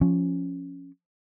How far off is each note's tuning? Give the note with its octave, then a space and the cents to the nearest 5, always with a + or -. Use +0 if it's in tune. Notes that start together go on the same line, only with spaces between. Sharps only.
F3 +0 C#4 +0